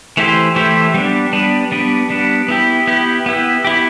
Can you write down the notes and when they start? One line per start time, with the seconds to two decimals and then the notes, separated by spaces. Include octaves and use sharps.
0.17 E3 A3 E4 G4 C5
0.56 E3 A3 E4 G4 C5
0.94 G3 B3 D4
1.33 G3 B3 D4
1.72 G3 B3 D4
2.10 G3 B3 D4
2.49 B3 E4 G4
2.87 B3 E4 G4
3.26 B3 E4 G4
3.65 B3 E4 G4